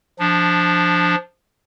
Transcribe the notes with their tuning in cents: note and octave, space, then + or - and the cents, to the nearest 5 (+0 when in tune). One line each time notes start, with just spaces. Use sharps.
F3 +0 D4 +0